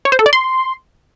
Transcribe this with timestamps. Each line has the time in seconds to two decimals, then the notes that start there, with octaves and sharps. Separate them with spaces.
0.05 C#5
0.12 C5
0.19 A4
0.26 D5
0.33 C6